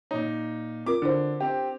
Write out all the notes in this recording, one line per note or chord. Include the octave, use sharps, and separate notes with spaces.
A#2 D#4 C#5
C4 F4 A#4 D6
D3 D4 E4 C5
C4 G4